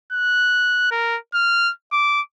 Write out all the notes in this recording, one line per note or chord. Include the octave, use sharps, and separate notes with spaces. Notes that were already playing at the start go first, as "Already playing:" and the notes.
F#6
A#4
F6
D6